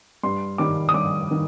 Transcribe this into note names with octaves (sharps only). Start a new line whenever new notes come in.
G2 C6
D#3 G3 D6
D#6
G2 D6
D#3